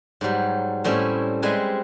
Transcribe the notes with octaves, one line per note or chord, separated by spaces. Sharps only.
G#2 F#3 G3
A2 G3 C4 C#4 E4
G3 G#3 C4 B4 G#5